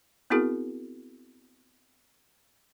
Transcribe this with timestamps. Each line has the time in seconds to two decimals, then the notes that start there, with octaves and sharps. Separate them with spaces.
0.30 B3 C4 E4 F#4 G#4 A#4